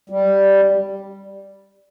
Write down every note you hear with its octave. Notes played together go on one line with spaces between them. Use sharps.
G3